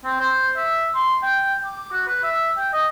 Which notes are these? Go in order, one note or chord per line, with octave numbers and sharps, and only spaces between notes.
C4
C5
E5
C6
G5
D6
F#4
B4
E5
G5
D#5